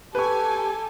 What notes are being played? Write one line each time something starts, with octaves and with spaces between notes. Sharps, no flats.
G4 A4 B4 G#5 C#6